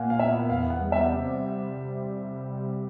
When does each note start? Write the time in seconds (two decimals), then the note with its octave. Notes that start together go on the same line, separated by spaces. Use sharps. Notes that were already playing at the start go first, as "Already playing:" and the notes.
Already playing: A#2 A#3 F5 F#5 G#5
0.10 F5
0.19 B3 E5
0.50 E2 F5
0.70 F#5
0.81 G3
0.92 E5
1.12 C3